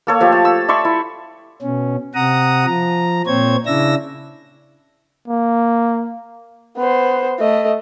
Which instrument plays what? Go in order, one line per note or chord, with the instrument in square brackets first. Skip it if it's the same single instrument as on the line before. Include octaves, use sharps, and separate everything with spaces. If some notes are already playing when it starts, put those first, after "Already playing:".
[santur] A#3 A4 C#5
F3 A3 G4
A5
E6
D5 E5 C6 C#6
E4
[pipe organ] B2 C#4
C3 F#5 A#5 D#6
F3 A#5
A#2 C4 C5 C#5 G#6
C#3 D4 E4 E6 A#6
[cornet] A#3
[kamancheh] B3 C5
A3 D#5